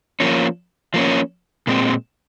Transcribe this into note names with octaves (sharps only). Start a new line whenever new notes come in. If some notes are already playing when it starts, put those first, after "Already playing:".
F3 A#3 C#4
F3 A#3 C#4
A#2 G#3 C4